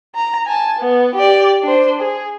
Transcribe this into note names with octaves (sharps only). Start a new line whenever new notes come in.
A#5
G#5 A5
B3
G4 D5
D4 C5
G#4